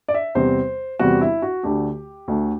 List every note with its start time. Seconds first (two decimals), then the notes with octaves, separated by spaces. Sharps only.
0.08 D5
0.14 E5
0.35 E2 C3 G3 C4 C5
0.99 E2 C3 G3 C4 F#4
1.21 E4
1.42 F#4
1.63 D2 D3 A3 G4
2.28 D2 D3 A3